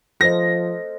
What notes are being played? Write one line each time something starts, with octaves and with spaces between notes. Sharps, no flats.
F3 A4 C5 D#5 A#6